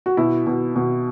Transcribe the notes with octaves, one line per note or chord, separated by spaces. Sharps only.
F#4
B2 E4
B2
B2